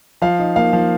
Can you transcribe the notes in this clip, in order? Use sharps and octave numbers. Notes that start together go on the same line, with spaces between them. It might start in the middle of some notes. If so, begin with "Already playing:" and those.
F3 F5
D#4
A#3 F5
F3